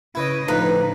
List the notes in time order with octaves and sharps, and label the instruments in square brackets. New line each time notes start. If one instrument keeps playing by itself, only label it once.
[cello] C#3 D#5 [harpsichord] E4 B4 C#5
[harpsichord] A2 F3 [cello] D3 [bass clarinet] D#4 [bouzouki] B4